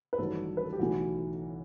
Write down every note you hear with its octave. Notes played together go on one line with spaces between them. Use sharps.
B4
A1 G2 D#3 F#3 A3 A4
B4
A4
G4
B1 A2 E3 A3 F#4